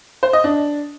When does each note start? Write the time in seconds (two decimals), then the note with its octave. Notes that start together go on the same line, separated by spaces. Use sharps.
0.23 C5
0.33 D#5
0.44 D4